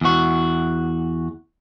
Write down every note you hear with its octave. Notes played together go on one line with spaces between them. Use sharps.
E2 F#4